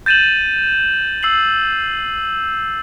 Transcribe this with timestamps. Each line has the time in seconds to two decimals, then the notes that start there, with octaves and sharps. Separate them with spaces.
0.06 G6 A6 D#7 E7 F#7
1.23 E6 C7 F#7